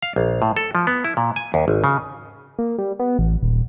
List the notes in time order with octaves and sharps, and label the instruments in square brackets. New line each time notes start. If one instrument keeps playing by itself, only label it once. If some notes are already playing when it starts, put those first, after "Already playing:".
[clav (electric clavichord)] F5
A#1
A2
A4
F3
B3
E4
A#2
G#5
D#2
G#1
C#3
[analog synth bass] A#3
G3
B3
A1
D#1